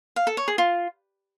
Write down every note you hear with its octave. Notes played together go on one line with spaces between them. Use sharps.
F5
A4
C#5
G#4
F4